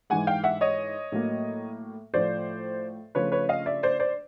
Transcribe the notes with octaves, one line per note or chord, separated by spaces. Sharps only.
G#2 E3 G#3 F#5 G#5
F5 G5
E5 F#5
C#5 D#5
A2 F#3 A#3
A2 F3 A3 C5 D5
C#3 F3 A3 B4 C#5
B4 C#5
D#5 F5
D5 E5
C5 D5
C5 D5